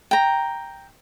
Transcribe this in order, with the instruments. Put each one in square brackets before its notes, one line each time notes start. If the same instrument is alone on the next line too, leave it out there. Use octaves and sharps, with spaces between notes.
[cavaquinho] G5 A#5